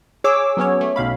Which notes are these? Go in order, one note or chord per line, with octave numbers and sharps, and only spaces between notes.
G#4 C#5 D6 E6
F#3 B3 C#4 C#5
A3
B1 B2 F5 B5